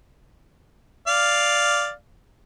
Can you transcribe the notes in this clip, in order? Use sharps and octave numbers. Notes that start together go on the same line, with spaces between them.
D5 F5